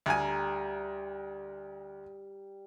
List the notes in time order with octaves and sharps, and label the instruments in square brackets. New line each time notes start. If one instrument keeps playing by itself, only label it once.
[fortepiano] D2 G#5 [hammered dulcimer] G3 G4 A#5